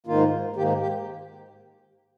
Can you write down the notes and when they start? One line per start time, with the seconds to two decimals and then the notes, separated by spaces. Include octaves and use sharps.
0.06 G#2 D#3 A#3 F4
0.56 G#2 D#3 A#3 G4
0.80 G4